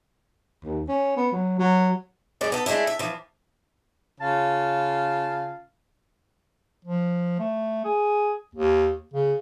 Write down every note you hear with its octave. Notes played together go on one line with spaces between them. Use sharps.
D#2
C#4
B3
F#3
F#3
F#2 G#3 D5
B3 A4
G#3 A3 D4 E4
E5
E3 F3
C#3 F4 F5 A5
F3
A3
G#4
D#2
C#3